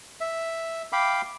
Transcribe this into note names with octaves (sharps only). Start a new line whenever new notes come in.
E5
F5 G5 B5 D6